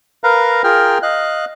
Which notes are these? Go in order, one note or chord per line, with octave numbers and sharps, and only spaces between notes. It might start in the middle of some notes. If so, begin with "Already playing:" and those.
A#4 B4 F5 A#5
F4 G#4 A#4 G5 F6
D#5 F5 F#6